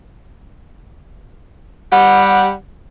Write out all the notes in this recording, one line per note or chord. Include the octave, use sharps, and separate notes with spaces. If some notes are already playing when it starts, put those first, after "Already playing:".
G3 G4 F#5